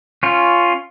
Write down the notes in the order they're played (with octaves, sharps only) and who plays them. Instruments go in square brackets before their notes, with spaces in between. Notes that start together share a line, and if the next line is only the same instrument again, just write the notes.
[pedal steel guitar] C#4 F4